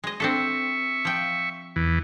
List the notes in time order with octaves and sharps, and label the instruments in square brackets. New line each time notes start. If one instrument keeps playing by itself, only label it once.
[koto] G#3 D#5
[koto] C4 D4 A4 [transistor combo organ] E5 C#6
[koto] F3 G5
[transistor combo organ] E2 E3